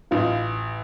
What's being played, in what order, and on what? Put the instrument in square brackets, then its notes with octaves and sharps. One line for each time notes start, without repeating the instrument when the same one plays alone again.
[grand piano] A1 [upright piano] D#4 F4